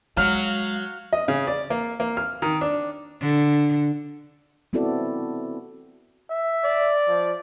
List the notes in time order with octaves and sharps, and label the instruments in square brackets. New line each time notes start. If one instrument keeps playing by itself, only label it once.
[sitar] F#3 [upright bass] G#3 [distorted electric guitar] F5 [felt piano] F6
[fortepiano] D#5
C#3
D5
A#3
A#3
F6
D#3
D4
[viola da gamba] D3
[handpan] B3 C4 E4 F#4 A4 D5
[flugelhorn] E5
[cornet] D5
[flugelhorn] F3